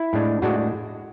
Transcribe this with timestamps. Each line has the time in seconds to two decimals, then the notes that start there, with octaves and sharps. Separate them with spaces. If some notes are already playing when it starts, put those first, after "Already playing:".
Already playing: E4
0.13 A2 G#3 D4
0.42 A2 G#3 D4 F#4